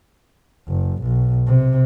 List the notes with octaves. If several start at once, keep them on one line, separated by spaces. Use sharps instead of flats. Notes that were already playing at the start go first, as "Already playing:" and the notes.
F#1
B1
C3